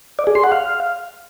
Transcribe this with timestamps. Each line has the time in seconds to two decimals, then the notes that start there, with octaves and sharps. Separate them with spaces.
0.19 D5
0.27 G#4
0.35 C6
0.44 F#5
0.52 F5